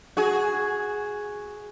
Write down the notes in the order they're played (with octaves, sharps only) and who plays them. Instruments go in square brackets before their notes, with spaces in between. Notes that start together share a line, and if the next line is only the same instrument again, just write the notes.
[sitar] F#4 G#4